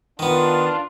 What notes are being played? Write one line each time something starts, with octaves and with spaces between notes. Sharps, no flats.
D#3 B3 D4 F4